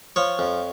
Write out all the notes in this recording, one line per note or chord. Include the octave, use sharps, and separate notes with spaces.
F3 C#5
F2